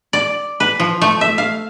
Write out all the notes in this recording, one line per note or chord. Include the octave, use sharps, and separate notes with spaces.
D5
B4
F3
A3
E5
F5